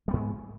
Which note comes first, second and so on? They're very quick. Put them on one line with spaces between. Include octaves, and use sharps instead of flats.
G3 B3 G#2 G#3